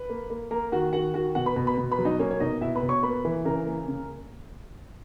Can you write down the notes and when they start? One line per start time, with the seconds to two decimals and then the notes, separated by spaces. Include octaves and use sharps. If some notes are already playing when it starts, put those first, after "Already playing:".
Already playing: B4 B5
0.10 A#3
0.30 A#3
0.51 A#3 A#4 A#5
0.72 D#3 F#4 F#5
0.93 D#3 F#4 F#5
1.14 D#3 F#4 F#5
1.35 B2 F#4 F#5
1.46 B4 B5
1.56 B2
1.67 B4 B5
1.77 B2
1.91 B4 B5
1.99 F#3
2.05 D#4 D#5
2.19 A#3 C#4 C#5
2.31 C#5
2.40 B2 D#4 D#5
2.61 B2 E4 E5
2.75 B4 B5
2.82 B2
2.89 C#5 C#6
3.03 A#3 B4 B5
3.25 E3
3.45 C#3 A#4 A#5
3.66 A#3
3.88 C#3